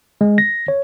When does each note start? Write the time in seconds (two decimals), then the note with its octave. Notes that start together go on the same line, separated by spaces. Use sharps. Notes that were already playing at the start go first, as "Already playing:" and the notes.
0.21 G#3
0.38 A#6
0.68 C#5